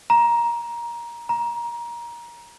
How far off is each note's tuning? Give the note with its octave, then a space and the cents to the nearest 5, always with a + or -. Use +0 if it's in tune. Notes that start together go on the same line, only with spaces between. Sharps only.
A#5 +15
A#5 +20